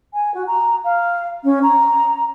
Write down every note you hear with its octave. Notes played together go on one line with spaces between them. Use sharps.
G#5
F#4
A#5
F5
C#4
A#5